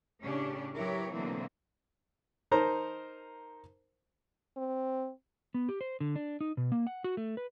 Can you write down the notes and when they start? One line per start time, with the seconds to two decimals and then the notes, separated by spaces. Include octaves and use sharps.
0.21 A2 C#3 C#4 D4 G4
0.77 F#3 E4 G4 A#4 B4 C#5
1.11 B2 D3 E3 F#3 A#3 C4
2.51 D#4 A#4 C5 A5 A#5
4.57 C4
5.54 B3
5.69 G4
5.81 C5
6.01 D3
6.16 D4
6.41 D#4
6.57 B2
6.72 A#3
6.87 F#5
7.04 F#4
7.17 A3
7.37 B4